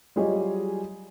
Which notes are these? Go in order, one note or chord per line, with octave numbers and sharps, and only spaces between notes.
F#3 G3 F4 G#4 C#5 D#5